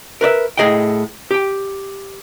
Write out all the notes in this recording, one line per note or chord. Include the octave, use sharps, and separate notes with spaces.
A#4 B4 D5 E5
A2 D#4 G#4 D#5 F5 G5
G4 G5